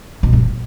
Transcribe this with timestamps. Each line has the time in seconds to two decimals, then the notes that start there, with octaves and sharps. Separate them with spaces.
0.23 B2
0.33 F#2